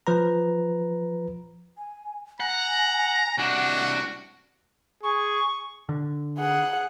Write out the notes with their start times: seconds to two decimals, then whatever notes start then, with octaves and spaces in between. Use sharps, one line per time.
0.07 F3 B4 A#5
1.78 G#5
2.40 F#5 G#5 A#5
3.38 C2 D4 F#4 F#5
5.03 G#4 C#6
5.89 D3
6.38 G#4 F#5